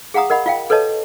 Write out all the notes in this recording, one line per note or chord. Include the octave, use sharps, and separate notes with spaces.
G#4 F5 F#5 A#5 D#6
A#4 D#5 F#5 B5
F4 F5 G5
A4 B4 C#5 D#5 A5